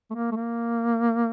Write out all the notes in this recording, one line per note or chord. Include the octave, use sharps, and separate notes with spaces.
A3
A#3
A3
A#3